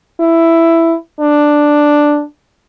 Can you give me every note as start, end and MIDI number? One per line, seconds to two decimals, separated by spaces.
0.20 0.95 64
1.20 2.23 62